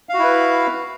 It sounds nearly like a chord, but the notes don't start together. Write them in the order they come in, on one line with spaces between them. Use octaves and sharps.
F5 F#4 E4 B4